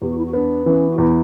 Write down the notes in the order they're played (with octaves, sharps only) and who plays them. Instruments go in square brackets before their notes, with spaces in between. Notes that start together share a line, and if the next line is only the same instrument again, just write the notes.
[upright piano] E2 [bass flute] G4
[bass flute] F#4
E4
F#4
[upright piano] B3 [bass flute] D4
[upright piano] E3 [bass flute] C#4
[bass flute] F#4
[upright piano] E2 [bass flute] E4